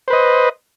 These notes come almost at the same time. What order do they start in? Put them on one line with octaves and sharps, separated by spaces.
C5 B4 D#5